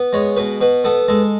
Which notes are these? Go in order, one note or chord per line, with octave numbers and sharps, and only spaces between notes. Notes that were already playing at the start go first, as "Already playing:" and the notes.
Already playing: B3
G#3 C#5
B2 B4
B2 B4
B3 A4
G#3 A4